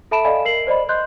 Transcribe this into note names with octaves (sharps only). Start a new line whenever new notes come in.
A4 E5 A5 B5 D7 E7
A4 D5 D#5 F5 G#5 B5
A#4 C7 F#7
C5 D5 D#5 B5
D#5 C6 F#6 G6